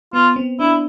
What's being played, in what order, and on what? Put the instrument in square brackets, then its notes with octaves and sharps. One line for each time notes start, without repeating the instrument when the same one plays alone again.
[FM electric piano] B3 [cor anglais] F4
[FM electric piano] C4
[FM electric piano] D4 [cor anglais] E4